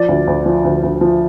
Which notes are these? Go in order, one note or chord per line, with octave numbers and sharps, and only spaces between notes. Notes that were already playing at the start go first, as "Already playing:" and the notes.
Already playing: F3 D5
D2
D2
F3
D2
D2
F3